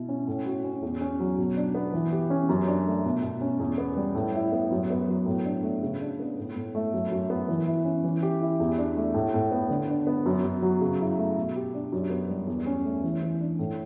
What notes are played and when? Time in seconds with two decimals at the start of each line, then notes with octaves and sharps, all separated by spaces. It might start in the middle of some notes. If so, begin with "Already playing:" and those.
Already playing: B2 E4
0.09 C#4
0.27 A2
0.46 F#4
0.64 C#4
0.82 E2
1.01 C#4
1.20 F#3
1.38 B2
1.57 D4
1.75 B3
1.94 E3
2.12 G4
2.30 C#4
2.49 F#2
2.68 D4
2.86 A3
3.05 B2
3.22 B2
3.41 C#4
3.60 E2
3.78 B3
3.96 G3
4.15 A2
4.34 E4
4.52 B3
4.71 F#2
4.90 B3
5.08 F#3
5.26 A2
5.45 D4
5.63 A3
5.82 C#3
6.01 D4
6.20 B3
6.38 A2
6.56 A2
6.75 A3
6.93 F#2
7.12 F#2
7.30 B3
7.49 E3
7.66 E4
7.85 C#4
8.05 E3
8.22 G4
8.41 E4
8.60 E2
8.78 D4
8.97 A3
9.14 A2
9.34 A2
9.52 B3
9.70 D3
9.89 D4
10.07 B3
10.26 F#2
10.44 F#2
10.63 F#3
10.81 C#3
11.00 E4
11.18 A3
11.37 B2
11.56 G4
11.74 D4
11.92 F#2
12.10 B3
12.30 G3
12.47 E2
12.66 C#4
12.85 A3
13.03 E3
13.22 E3
13.40 D4
13.59 A2